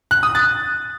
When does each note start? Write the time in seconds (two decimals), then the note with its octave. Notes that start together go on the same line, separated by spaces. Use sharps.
0.11 F#6
0.23 D#6
0.35 A6